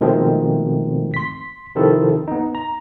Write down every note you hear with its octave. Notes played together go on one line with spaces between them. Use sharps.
B2 D#3 F3 G#3 A3 C4
C6 B6
C3 D#3 F3 E4 A4
B3 D#4
A#5